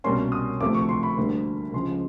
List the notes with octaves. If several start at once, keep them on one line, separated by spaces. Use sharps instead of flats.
C2 B2 G3 A#3 C#4 C6
D#6
D2 C3 F3 A3 D6
C#6
C6
B5
D2 D3 G3 A#3
C#2 C#3 F3 G#3 C6